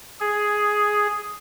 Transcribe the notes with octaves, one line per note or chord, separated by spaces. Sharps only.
G#4